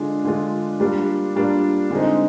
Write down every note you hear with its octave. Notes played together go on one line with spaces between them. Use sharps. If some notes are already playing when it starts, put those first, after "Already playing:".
Already playing: D3 G#3 D4 F4
D3 G#3 D4 F4
G3 A#3 D4 F4
G3 A#3 D4 F4
D3 G#3 C4 D#4